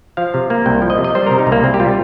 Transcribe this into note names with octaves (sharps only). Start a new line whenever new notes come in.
F3 F5
C3
A#3
C2 G5
F3
D#5
C3
D#5
G3 C5
C3 A#4
D#4
C2
A#3
C2 C4
G4
G3 F4